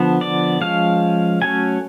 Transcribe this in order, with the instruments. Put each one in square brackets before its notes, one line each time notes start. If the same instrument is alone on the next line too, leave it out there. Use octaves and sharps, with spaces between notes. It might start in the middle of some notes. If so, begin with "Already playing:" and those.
Already playing: [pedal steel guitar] D3 F3 B3
D5
F3 G#3 C#4 F5
F#3 A3 C#4 G#5